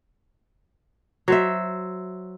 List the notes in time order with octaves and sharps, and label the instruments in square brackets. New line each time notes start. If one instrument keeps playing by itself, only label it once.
[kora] F#3 C5 E5